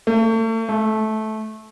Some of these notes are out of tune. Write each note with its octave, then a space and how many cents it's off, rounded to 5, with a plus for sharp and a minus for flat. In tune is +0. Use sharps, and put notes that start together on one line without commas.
A3 +40
A3 -15